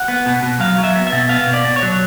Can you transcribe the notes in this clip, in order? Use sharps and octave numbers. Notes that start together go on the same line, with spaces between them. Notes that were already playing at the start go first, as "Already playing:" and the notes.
Already playing: F#5
B3
B2
B2
F#3 F5
F#3
E5
B3
E5
B2
B3 F5
B2
D5
B2
C#5
F#3